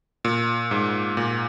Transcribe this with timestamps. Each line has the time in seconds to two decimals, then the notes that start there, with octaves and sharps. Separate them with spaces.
0.25 A#2
0.71 G#2
1.17 A#2